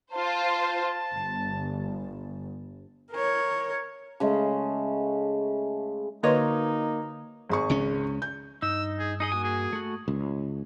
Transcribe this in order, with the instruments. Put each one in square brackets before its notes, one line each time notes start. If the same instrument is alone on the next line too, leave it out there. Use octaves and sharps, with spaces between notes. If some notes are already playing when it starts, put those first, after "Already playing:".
[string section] F4 C5 [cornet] A5
[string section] G1
[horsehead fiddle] A#4 C#5
[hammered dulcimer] C#3 G#3 A3
[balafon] D3 B4 C6 [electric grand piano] A#3 [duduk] D#4 [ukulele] F#4 C#5 D#5
[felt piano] G#1 G#4 C#6
[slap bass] C#2 C#3 C#4
[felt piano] G6
[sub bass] G2 [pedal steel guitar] D#4 [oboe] E6
[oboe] G#4
[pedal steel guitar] D#4 G#4 D#5 [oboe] D#6
[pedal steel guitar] A#3 F#4 G#5
[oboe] G#4
[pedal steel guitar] A3 F#4
[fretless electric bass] C#2